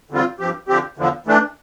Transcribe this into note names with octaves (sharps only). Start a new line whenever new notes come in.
E2 D3 G3 C4 F4
G2 F3 C4 G4
D3 F3 C4 G4
E2 D3 F3
E3 A3 D4